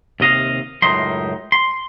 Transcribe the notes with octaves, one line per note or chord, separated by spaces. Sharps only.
D#2 C3 D#5 F5
C#2 F#2 A2 D#4 C6
C6